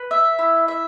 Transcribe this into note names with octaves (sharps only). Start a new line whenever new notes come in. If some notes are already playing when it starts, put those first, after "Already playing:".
Already playing: B4
E5
E4
E5